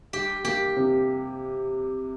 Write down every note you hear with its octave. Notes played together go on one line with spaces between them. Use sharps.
G3 G4
A#3 G4
C3